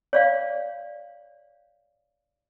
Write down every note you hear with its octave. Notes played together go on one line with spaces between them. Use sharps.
C#5 D5 F5